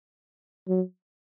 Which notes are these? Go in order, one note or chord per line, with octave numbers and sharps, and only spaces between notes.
F#3